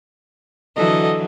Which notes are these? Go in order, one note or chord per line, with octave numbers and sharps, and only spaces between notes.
D3 E3 F#3 A4 D#5